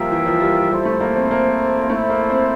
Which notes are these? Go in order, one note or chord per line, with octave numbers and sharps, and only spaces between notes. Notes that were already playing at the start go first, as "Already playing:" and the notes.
Already playing: F3 G3 A#3 F4 A#4 E5 G5
E3
F3
G3
G3
G3 E4 A4 C5
A3
A#3
C4
A#3
A#3
A3 E4 A4 C5
A#3
C4